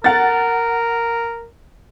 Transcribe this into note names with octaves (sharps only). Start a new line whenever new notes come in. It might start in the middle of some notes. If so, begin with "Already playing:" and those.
A#4 F#5 A6